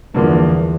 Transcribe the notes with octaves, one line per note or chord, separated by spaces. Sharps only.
E2 G2 D3 F3 A#3